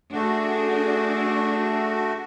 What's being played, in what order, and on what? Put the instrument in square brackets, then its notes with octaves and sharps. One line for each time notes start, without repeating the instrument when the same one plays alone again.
[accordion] A3 F#4 [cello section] D4 G#4